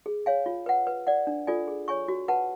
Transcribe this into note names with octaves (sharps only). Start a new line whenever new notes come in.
G#4
C#5 F5 G#5
F4
B4 F#5
B4
D5 F#5
D4
F4 A4 D5 G#5
G#4
C#5 G#5 C#6
F#4
B4 F#5 A5